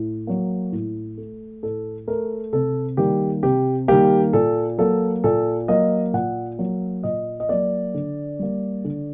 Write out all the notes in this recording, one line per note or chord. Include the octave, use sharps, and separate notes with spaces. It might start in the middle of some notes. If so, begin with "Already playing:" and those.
Already playing: A2
F#3 A#3
A2
A3
A2 A4
A3 A#4
C3 A4
D#3 G3 A#3 G4
C3 G4
D#3 G3 A#3 G4
A#2 A4
F#3 A#3 A4
A#2 A4
F#3 A#3 D#5
A#2 F#5
F#3 A#3
A#2 D#5
D#5
F#3 A#3 D5
D3
G3 A#3
D3